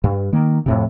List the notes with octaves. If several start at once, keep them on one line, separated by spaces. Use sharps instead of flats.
G2
D#3 A#3
F2 A2 C3